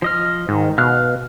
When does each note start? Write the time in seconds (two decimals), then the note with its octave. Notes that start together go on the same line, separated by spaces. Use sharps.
0.02 F3 D#5 F6
0.48 G#2 D#3
0.78 B2 F5 F6 F#6